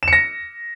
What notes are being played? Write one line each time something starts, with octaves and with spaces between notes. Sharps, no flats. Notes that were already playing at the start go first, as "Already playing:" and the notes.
A#6 C#7 E7